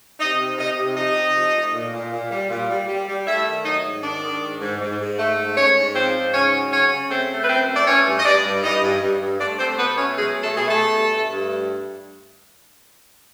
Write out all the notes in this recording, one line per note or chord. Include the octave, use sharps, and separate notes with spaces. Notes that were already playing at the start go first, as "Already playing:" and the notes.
C3 D#4 D#5
C3
C3 D#4 D#5
C3
F3 D#4 D#5
C3
F3
A3
A#2
A#2
A#2
G3
A#2
G3
G3
G3
A3 E4 E5
D#3
F#3 D#4 D#5
G#2
D#3 D4 D5
D#3
G#2
G#2
G#2
G#2
A3
G#2
G#2 C#4 C#5
G#2
F3 C4 C5
G#2
C#3 C#4 C#5
F#3
C#3 C#4 C#5
C#3
A3 C4 C5
A3
B4
F#2 C4 C5
A3
D5
E3 C#4 C#5
G2
D#5
G2 D4 D5
G2
E3 D#4 D#5
G2
G2
G2
A3 D4 D5
A3 C4 C5
B2 B3 B4
A3 C#4 C#5
F#3 G#3 G#4
B2
A3 A4
B2 G#4
A3 A4
B2
G2
A3
G2